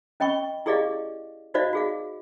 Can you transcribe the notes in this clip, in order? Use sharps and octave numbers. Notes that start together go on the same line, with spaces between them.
C#4 D#5 G5 B5 C#6
E4 G4 G#4 D5 D#5 F5
D#4 F#4 C5 D5 D#5 F5
F#4 G#4 F5